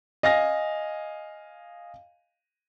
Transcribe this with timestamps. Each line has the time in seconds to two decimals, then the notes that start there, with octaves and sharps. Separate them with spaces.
0.23 D#5 F5 G#5 A#6